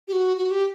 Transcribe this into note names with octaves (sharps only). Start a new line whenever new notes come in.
G4
F#4
F#4
G4